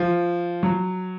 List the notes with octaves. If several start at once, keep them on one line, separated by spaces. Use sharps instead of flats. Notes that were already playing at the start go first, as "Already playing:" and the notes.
Already playing: F3
F#3